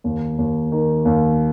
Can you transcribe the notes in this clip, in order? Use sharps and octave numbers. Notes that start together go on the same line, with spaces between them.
D#2
D#2
D#3
D#2